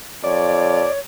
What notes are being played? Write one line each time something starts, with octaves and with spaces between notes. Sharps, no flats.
F2 C#5 D5